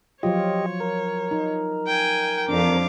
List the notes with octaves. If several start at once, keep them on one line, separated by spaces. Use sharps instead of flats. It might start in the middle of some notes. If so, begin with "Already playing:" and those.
F3 F#3 F4 G4 C#5 D#5
A#4
D#4
G5 G#5
F2 D4 F5 D6